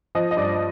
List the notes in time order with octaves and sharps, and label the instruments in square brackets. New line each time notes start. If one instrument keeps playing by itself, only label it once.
[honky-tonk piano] F3 D#5
D#5
G2 D5